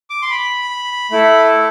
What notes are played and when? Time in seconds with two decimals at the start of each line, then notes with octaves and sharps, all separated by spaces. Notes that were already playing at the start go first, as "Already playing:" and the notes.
0.10 D6
0.22 C6
0.30 B5
1.11 A3 E4 A4